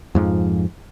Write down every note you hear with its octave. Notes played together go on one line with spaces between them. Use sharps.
F2 G#2 F3